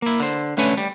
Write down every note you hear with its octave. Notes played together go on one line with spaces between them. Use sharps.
A#3 E4
D3 C5
D3 A3 C#4 B4 C#5 G#5
G3